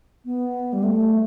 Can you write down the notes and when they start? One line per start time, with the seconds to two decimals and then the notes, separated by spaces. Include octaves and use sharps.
0.25 B3
0.73 G3
0.84 A3